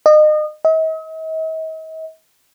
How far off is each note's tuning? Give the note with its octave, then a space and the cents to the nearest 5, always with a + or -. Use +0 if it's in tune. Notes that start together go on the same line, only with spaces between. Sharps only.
D#5 -30
D#5 +45